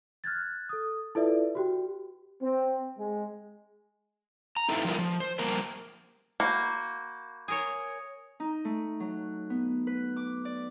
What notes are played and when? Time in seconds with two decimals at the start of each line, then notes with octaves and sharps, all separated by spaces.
0.24 F6 F#6 G#6 A6
0.69 A4 D#6
1.15 E4 F4 A4 B4 D5 E5
1.55 F#4 G4 G5
2.42 C4
2.98 G#3
4.56 A#5
4.69 D#4 E4 A4 B4 E5 F5
4.85 F3 G3 F4 A#4
4.98 F3
5.20 C5
5.38 F3 G3 A#3 A#4 C5
6.40 A#3 F#4 B5 C#6 G6
7.48 G#4 A#4 C#5
8.40 D#4
8.65 A3
9.00 F#3
9.50 B3
9.87 B4
10.17 D6
10.45 D5